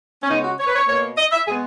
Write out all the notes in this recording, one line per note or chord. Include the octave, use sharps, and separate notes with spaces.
C#4
C#3 G#3 B3 D#4
F#4
C#5
B4
C#5
B2 A#3 C#5
D#5
E5
B2 G#3 B3 G#4